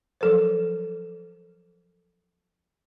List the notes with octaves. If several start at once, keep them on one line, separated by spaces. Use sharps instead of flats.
F3 F#3 A4 A#4 C5